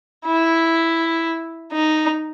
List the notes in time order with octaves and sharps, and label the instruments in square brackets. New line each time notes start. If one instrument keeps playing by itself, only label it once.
[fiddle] E4
D#4